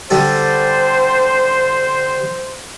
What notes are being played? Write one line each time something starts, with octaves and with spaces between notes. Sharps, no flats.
D3 G3 A4 C5